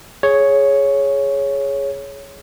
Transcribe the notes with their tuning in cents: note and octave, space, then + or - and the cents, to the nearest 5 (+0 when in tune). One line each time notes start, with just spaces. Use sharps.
G#4 +5 C#5 +0